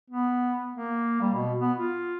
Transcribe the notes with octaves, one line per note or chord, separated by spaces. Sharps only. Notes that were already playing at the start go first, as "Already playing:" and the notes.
B3
A#3
G3
B2
B3
F4